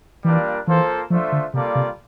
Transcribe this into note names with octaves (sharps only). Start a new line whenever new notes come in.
E3 G3 A#3 D4 F4 A#4
E3 A#3 F4 A4 C5
F3 A3 D4 F4 C5 E5
D3
C3 G3 A#3 F4 A4 D5
C3